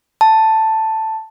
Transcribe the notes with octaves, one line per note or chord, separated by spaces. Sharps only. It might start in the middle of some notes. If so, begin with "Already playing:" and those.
A5